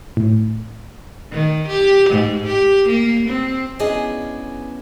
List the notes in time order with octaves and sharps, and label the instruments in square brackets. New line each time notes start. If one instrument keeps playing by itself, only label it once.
[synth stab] A2
[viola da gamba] D#3
G4
G#2
G4
A#3
C4
[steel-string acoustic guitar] B3 C#4 D4 E4 G#4 D#5